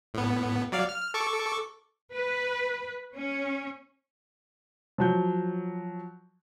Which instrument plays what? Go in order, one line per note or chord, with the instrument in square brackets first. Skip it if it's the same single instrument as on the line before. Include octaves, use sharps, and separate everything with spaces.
[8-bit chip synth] A2 B3
F#3 D5 F5
F6
A4 C#6 D6
[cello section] B4
C#4
[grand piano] F3 F#3 G6